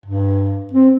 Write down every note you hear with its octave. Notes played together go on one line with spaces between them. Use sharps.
G2
C4